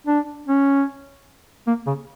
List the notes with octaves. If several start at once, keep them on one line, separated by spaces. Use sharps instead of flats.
D4
C#4
A#3
C#3